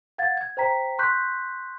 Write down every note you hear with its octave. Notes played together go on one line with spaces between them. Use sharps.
F5 F#5 G#6 A6
G#6
C5 G5 A#5 B6
C6 C#6 F#6 G6 B6